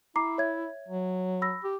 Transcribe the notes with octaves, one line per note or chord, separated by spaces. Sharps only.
E4 A#5 D6 C7
C#5 E5 G#6
F#3
B5 E6 A#6
G4